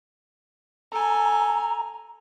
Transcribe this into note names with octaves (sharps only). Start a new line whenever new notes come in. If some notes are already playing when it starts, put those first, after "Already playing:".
A4 G#5 A#5